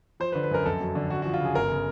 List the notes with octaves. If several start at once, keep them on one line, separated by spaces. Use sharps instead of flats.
F3 C5
B4
D3
B4
F#2 A#4
F2 A4
F#3
D3
F#2 F#4
F#4
F3
F4
C#3 G#4
G1 A#4
C#3